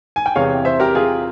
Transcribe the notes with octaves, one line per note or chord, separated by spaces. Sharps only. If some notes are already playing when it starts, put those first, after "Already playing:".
G#5
G5
E2 C3 E3 G#3 C#5 F5
C5 E5
G4 A#4
F4 G#4